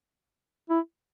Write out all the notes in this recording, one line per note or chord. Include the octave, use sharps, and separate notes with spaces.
E4